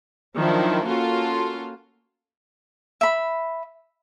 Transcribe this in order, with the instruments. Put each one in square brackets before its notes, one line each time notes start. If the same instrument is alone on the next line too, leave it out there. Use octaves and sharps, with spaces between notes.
[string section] D#3 F3 F#3 D4 E4
A#3 C#4 F4 F#4 A4
[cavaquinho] E5 B5